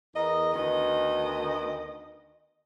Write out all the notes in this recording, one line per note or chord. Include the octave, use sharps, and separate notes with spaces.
E2 A#4 D#5
D2 D#3 B3 D#5